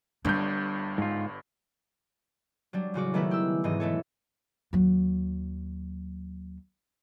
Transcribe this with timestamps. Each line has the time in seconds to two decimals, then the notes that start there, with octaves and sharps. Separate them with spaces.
0.25 G1 G2 G3 D4 G6
0.98 G#2 F4
2.73 F#3 G3 D4
2.94 A1 C#3 F#4 D6
3.14 D#3 G#3 A3 B3 E4 B4
3.31 G4 E6
3.64 E1 G#2 E3 D#5
3.80 E3 A3 A4 C#5
4.73 D#2 F#3